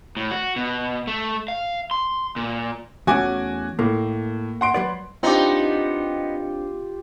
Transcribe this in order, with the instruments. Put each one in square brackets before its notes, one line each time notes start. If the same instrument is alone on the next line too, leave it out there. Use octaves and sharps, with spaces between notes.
[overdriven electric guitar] A2
F#4
B2
A3
F5
C6
A#2
[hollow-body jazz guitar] E2 A3 C#4 [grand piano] F#4 G#5 D6
[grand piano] A2 [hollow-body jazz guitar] A#3
[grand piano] F#5 C6 D7
[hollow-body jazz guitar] F#3 B4 D5
[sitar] B3 D#4 [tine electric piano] C4 D4 [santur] F4 G4